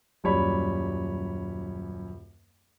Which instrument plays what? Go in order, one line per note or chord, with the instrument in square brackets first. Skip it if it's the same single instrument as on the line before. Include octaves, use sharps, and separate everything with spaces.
[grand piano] D#1 F#2 G3 C#5 D5 B5